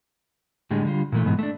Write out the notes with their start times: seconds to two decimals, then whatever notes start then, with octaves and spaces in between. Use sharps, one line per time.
0.71 A2 D3 G3 G#3
0.85 D3 G3 F4
1.12 A#2 E3 A3
1.26 G#2 B2 E3
1.39 A3 D4